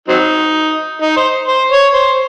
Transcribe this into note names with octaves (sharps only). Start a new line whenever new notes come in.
F#3 C4 D#4
D#4
C5
C5
C#5
C5